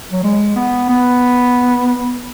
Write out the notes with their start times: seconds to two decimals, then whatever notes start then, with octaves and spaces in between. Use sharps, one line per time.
0.12 F#3
0.24 G#3
0.56 B3
0.89 B3